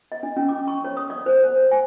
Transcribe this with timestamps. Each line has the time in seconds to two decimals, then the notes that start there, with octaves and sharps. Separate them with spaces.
0.12 D#5
0.23 D4
0.37 C#4
0.48 D6
0.68 C#6
0.85 C#5
0.97 D#6
1.10 D5
1.26 C5
1.44 C5
1.56 C5
1.71 G#5